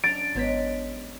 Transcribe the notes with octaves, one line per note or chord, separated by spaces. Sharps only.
F#2 D4 A#5 A6 D7
G#1 F#3 G#3 B3 D4 B6